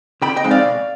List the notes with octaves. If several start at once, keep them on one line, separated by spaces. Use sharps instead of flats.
D3 G5 B5
D#5 G5
F3 G#3 C4 D#4
D5 F5
B2